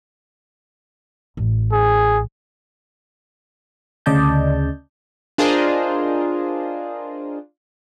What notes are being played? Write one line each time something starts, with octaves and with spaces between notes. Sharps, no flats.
A1
G#4
D2 C#3 D5 D#5 A5 G6
D4 F4 G#4 A#4 C5 D#5